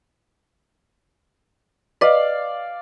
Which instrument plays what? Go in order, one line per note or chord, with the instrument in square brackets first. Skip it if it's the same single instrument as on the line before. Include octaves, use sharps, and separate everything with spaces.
[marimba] B4 D#5 [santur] D5 F5